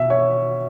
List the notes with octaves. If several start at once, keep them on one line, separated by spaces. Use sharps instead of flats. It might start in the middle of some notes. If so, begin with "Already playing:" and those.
Already playing: B2 E5
C#5